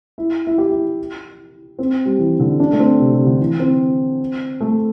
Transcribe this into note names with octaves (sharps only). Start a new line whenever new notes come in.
E4
E4
G4
E4
C4
G3
E3
D3
D4
A3
C4
C3
C3
D3
E3
C4
A3